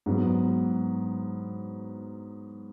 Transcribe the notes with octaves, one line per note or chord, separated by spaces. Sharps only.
G#2 F#3 B3